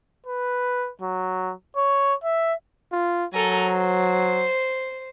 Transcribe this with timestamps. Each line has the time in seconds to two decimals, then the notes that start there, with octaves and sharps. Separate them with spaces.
0.27 B4
1.02 F#3
1.76 C#5
2.24 E5
2.92 F4
3.34 F#3 A4 A#4 G#5
3.69 C5